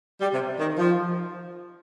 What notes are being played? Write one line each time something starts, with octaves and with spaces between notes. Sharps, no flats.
G3
C3
D#3
F3